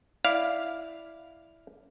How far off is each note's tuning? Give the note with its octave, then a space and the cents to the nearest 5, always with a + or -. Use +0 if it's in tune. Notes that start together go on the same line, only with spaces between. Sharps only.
E4 +0 D5 +0 F5 +0